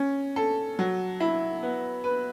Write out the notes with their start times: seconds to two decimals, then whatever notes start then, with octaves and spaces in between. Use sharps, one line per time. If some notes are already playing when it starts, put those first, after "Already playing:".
Already playing: C#4
0.36 A4
0.79 F#3
1.20 E4
1.62 B3
2.04 B4